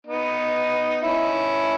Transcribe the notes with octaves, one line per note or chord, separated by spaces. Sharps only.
B3 D#4
C#4 E4